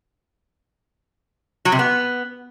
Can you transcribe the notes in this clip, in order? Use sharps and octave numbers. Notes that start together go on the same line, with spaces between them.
F#3
C3
B3